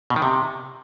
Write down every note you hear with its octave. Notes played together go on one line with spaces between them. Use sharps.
B2
D#3
C3